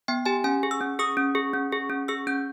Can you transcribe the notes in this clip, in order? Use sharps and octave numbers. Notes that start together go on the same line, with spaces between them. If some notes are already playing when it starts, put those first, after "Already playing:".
B3 G5
G4 G#5
C#4 G#5
G#4
E6
C#4
G#4 D#6
C#4
G#4
C#4
G#4
C#4
G#4 E6
C#4 G6